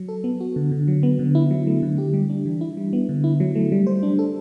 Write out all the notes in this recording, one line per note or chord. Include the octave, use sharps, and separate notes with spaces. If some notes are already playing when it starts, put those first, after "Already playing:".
Already playing: F#3
A4
B3
F#4
D3
D3
F#3
B3
D3
E4
F#3
A3
D3
G4
G3
D4
E3
E4
G3
B3
D3
E4
F#3
A3
G3
C5
D4
A4